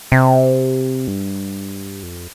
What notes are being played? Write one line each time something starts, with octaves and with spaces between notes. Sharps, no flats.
C3
G2
F2